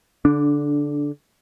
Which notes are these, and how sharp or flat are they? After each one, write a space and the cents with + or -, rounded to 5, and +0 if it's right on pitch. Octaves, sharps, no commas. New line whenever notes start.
D3 -25 D4 +0